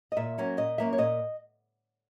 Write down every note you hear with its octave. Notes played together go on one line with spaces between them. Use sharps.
D#5
A#2 E5
F#3 A#3 C#4
A#2 D#5
F#3 A#3 C#4 E5
C#5
A#2 D#5